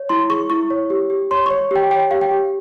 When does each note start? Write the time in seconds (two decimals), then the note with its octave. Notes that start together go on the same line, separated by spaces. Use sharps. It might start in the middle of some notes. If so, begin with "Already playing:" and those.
Already playing: C#5
0.09 E4 C6
0.30 G#4 C#6
0.50 E4 C#6
0.70 C#5
0.90 G4
1.10 G4
1.31 C#5 C6
1.46 C#6
1.51 C#5
1.71 G4 G5
1.91 C#5 G5
2.11 G4 F5
2.21 G5
2.31 G4